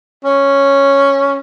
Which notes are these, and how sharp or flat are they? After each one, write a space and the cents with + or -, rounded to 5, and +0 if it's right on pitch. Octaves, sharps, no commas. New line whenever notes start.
C#4 +0